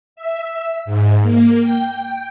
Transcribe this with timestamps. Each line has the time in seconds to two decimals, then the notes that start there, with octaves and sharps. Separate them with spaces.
0.16 E5
0.85 G#2
1.22 A#3
1.60 G5